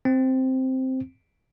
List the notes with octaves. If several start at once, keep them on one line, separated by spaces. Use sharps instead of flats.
C4